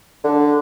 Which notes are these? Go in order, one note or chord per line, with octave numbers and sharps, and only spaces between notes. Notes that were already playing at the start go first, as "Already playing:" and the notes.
D3